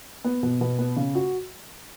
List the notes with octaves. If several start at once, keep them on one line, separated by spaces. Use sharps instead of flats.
B3
B2
B2
B3
C#3
F#4